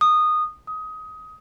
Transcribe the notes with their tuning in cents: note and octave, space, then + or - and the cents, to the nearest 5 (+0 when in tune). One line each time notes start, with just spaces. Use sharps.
D#6 -15
D#6 +20